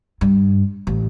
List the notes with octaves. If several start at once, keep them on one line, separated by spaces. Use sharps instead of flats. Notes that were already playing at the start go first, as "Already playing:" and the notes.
G2
A1